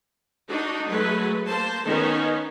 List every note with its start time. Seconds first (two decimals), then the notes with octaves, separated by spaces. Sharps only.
0.47 D4 D#4 F#4
0.88 F#3 G#3 A3 B4
1.47 A#3 C5 A5
1.86 D#3 B3 C#4 D#4